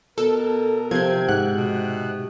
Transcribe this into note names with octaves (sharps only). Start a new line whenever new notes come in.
B2 A4 A#4
C3 F3 C5 G#6
G#2 F#5 F#6
B2